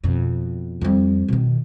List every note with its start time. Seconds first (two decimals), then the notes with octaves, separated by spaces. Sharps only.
0.04 F2 B2
0.81 F2 G3
1.28 B2 D#3